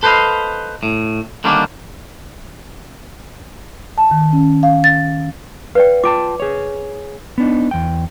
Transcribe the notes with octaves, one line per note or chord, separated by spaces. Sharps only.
A4 B4 C5 D5 D#5 F5
A2
D3 D#3 G3 A#3 C#4 D4
A5
D#3
C#4
F5
A6
B4 D5 F5 G5
F4 G5 A5 D6
G#4 C#5
B3 D4 D#4
E2 G5